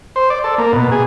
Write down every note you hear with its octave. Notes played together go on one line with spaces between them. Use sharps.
C5
D5
A4
A#3
B2
G#4